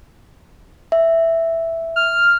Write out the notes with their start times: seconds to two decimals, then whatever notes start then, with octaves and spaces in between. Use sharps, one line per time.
0.92 E5
1.96 F6